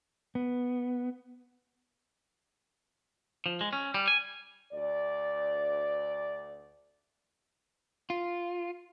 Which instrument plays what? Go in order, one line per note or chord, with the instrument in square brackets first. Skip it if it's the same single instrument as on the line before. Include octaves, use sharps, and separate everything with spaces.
[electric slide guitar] B3
[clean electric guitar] F3
G#3
C#4
G3
G#5
[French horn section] D2 D5
[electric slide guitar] F4